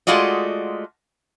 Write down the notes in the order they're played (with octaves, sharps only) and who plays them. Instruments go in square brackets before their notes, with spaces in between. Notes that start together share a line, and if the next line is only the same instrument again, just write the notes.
[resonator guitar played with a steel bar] G#3 A3 F4 F#4 D5 D#5